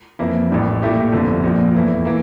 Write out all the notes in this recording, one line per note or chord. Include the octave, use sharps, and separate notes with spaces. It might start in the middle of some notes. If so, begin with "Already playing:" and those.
F2 E3 A#3 E4
A1 A2 G3
A#2 A3 E4 G4
G1 F2 D3
A#1 A#2 F3
E2 E3 A3 E4
E3 A#3